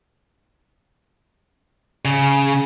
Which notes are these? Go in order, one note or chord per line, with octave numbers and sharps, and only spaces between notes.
C#3